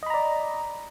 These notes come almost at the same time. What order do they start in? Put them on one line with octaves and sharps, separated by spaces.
D#5 B5 A#5 D5